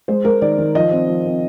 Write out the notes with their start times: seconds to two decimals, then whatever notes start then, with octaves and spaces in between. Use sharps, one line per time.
0.08 G#3 C5
0.25 G#3 A#4
0.42 D#3 D5
0.59 D#3
0.75 F3 D#5
0.91 C4
1.09 F3
1.26 C4